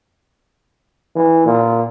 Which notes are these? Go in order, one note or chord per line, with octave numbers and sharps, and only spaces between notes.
E3
A#2